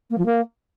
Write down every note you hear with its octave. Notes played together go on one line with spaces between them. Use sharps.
A#3
F3
A#3